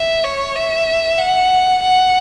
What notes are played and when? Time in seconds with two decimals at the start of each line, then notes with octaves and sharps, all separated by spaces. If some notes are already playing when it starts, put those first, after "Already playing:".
Already playing: E5
0.24 C#5
0.56 E5
1.18 F#5
1.82 F#5